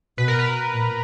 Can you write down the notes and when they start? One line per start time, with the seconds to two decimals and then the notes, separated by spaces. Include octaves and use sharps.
0.18 B2 B4
0.28 A#4
0.39 B4
0.74 A#2